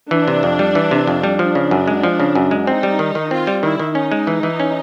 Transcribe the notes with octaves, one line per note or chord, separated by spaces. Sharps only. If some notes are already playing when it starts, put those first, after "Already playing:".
E3 D4
C3
F2
G3
E3
C3
F2
G3
F3 D4
C#3
F#2
G#3
F3
C#3
F#2
G#3
C4 D#4
G3
D#3
D#3
C4 F4
G3
D#3 E4
D#3
C#4 D#4
G#3
E3
E3
C#4